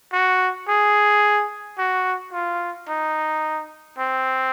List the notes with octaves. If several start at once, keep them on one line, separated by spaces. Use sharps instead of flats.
F#4
G#4
F#4
F4
D#4
C4